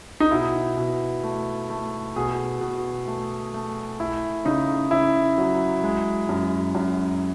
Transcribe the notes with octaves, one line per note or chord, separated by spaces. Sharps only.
D#4
B2 E4
B2
A3
A3
B2 G#4
B2
A3
A3
A3 E4
C#3 D#4
C#3 E4
F#3
G#3
F#2
F#2